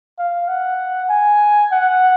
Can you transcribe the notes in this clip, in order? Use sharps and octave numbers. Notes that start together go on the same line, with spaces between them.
F5
F#5
G#5
F#5